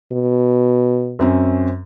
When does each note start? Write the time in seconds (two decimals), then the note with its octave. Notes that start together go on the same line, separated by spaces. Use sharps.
0.12 B2
1.19 F#2 C4 C#4